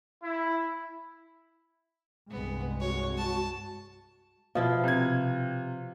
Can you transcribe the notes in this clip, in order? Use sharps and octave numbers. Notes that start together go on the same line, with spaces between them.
E4
C2 G2 G#3 B3
F#4 C#5
A5
B2 F3 E4 F5
C3 G#6